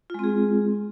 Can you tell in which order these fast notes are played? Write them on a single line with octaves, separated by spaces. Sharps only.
F4 G#3 C4 G#4